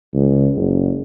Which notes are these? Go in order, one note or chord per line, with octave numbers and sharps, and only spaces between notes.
C#2
F#1